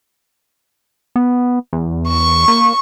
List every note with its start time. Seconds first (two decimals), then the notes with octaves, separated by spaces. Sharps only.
1.16 B3
1.73 E2
2.07 C#6
2.48 A#3